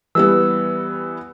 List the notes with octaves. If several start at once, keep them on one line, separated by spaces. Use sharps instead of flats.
E3 G3 B3 E6